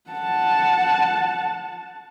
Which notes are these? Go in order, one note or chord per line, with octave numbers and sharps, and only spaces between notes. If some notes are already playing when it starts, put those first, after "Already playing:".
F#5 A5